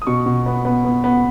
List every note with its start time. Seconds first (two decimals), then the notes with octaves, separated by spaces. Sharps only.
0.02 D#6
0.07 B2 C#6
0.26 B2
0.46 B3
0.65 B3
0.85 B3
1.04 B3